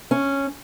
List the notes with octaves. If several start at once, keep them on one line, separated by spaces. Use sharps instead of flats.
C#4